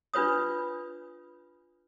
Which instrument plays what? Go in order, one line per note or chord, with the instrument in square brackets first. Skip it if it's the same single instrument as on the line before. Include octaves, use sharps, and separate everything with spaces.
[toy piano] D4 F4 B4 C#5 D#6